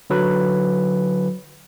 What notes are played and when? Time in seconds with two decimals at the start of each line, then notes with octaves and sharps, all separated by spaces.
0.10 D3 F#3 B4